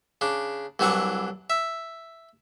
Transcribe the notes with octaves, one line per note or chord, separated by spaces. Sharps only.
C#3 D4
C2 E3 F#3 D4 F#5 C#6
E5